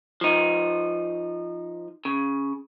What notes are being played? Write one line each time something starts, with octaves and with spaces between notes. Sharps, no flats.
F3 D#4
C#3